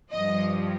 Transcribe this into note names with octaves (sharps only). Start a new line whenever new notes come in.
G2 F3 D#5